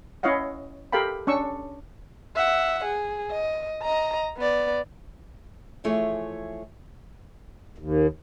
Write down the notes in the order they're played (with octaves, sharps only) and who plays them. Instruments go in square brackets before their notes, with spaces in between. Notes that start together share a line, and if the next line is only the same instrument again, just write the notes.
[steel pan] C#4 E4 C#5 D#5 F5 F#5
G4 A4 A#4 F5 G5 B5
C#4 D4 C#6 E6
[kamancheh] E5 F#5
G#4
D#5
D#5 A#5
B3 D5
[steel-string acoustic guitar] E3 F3 A3 G#4 C#5
[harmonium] D#2